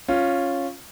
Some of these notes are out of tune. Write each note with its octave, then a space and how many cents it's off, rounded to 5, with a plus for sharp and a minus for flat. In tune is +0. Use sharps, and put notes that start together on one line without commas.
C#4 -5 F4 +0